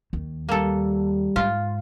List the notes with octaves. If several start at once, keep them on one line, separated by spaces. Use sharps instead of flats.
D#2
G3 A#3 A4
G#2 F4